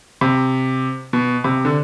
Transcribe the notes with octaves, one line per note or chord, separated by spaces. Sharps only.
C3
B2
C3
D3